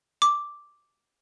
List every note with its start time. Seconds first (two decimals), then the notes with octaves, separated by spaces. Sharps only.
0.22 D6